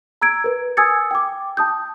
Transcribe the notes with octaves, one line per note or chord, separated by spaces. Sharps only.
A#5 E6 G#6 D7
A#4 B4
G#5 D#6 E6 G#6 A6 C#7
G5 D6
A5 D#6 G6